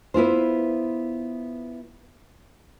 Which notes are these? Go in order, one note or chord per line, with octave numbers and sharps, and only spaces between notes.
B3 E4 F4 C5